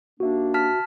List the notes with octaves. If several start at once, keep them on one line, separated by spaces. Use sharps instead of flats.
D#2 A#3 D4 F#4 E5
A5 F6 B6